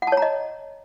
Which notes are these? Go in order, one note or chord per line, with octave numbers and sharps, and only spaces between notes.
F#5
A5
C#5
A#5
D#5